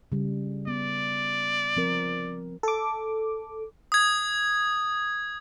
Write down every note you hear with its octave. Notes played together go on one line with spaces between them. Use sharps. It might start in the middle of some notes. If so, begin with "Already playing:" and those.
C#3 G3
B3 D5
F3 C4 A#4
A4 D6
D#6 G#6